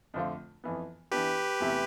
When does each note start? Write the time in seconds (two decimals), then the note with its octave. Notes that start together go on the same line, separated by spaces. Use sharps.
0.14 F2 D3 A3 C4 F4
0.64 F2 E3 B3
1.11 E3 B3 D4 G4 B4
1.60 E2 C3 E3 A3